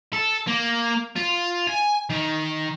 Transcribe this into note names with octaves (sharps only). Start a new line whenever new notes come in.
A4
A#3
F4
G#5
D#3